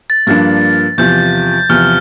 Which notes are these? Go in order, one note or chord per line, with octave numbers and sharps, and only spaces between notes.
A6
G2 F3 A#3 D4 A6
E2 C3 F3 G6
E2 C3 F3 F6